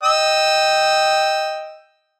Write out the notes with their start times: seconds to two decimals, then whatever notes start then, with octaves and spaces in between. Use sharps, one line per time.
0.03 D#5 G5 E6